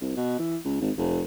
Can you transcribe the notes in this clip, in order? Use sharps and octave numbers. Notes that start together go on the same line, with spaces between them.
C2
B2
E3
C#2
G#1
F1